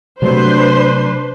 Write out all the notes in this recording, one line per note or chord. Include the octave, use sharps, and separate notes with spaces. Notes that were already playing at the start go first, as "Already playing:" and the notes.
C3 F#3 A3 D4 B4 C5